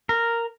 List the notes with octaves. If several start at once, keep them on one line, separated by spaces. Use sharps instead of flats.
A#4